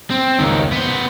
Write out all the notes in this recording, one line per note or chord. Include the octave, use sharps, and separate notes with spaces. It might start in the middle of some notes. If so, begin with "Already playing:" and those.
C4
C#2 D#3
B3 C5